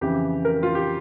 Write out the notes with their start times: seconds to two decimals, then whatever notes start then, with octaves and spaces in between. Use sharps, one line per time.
0.01 F2 C#3 E3 G4
0.45 A#4
0.63 F4
0.75 G4